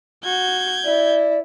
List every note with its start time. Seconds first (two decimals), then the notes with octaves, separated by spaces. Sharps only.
0.24 F#4 G6 G#6
0.85 E4 D5